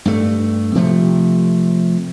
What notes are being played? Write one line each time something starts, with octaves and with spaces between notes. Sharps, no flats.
G2 A3
C3 F3 A3